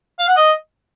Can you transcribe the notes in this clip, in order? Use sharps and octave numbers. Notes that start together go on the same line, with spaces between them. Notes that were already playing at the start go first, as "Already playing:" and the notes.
F5
F#5
D#5